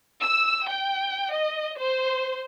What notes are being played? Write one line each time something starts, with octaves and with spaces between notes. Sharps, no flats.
E6
G5
D#5
C5